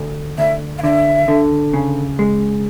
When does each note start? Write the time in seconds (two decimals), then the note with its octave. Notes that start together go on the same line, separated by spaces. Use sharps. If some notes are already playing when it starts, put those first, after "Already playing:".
Already playing: D2
0.38 D2 E5
0.78 F5
0.83 D3 E5
1.28 D3
1.73 C#3
2.19 G#3